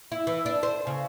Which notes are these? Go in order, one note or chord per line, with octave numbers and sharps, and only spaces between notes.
E4
E3
D4
C5
C#3